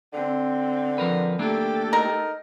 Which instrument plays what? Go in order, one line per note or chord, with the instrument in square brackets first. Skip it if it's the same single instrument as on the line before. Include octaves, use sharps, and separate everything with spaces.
[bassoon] D3 [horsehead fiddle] C4
[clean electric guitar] F3 A#4 B4
[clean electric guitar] A3 A#3 D4 [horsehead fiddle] G4 A4
[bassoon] D#4 [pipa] A#4